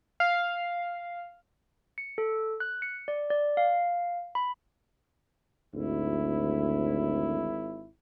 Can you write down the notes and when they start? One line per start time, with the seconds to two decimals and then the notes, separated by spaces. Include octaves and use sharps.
0.20 F5
1.98 C#7
2.18 A4
2.60 F#6
2.82 C#7
3.08 D5
3.30 D5
3.57 F5
4.35 B5
5.74 G#1 D2 E4